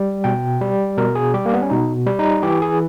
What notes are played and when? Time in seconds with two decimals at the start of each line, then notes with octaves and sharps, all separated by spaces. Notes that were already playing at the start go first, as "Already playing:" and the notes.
Already playing: G3
0.24 B2 G5
0.61 G3
0.97 B2 A#4
1.15 G#4
1.34 G3 G4
1.46 A#3
1.54 B3
1.62 C#4
1.70 B2 D#4
2.06 G3
2.19 D#4
2.43 E3 G4
2.62 G#4